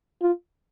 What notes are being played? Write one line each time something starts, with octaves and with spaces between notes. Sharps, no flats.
F4